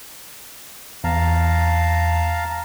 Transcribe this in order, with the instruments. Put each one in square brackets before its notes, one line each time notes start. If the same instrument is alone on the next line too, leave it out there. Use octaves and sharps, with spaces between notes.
[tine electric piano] E2 [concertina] F5 A5 A#5